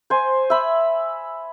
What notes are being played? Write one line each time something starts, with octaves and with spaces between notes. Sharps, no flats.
C5 G#5
E5 B5